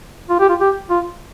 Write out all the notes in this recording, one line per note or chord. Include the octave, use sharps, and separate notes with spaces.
F4
G4
F4
G4
F4